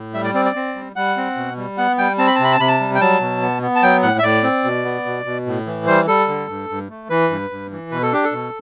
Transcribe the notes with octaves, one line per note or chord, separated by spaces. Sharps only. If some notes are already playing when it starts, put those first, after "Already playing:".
Already playing: A2
G3 E5
D5
C4 D5
D5
C4
G3
G3 F#5
C4
B2
G3
B3 F#5
G3 G5
C4 A5
B5
A5
C3 B5
A5
C3 B5
A5
G3
G5
F#3 A5
B2
B3
B3
A5
F#3 G5
A2 F#5
E5
A2 D5
C4
B2
B3
B2
B2
A2
E3
G3 C5
G3 A4
D3
G2
G2
A3
E3 B4
G2
G2
E3
B2 B4
A4
D4 G4
A4
B2